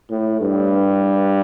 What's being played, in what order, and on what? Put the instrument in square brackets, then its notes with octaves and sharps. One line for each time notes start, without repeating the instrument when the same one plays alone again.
[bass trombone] A2
G2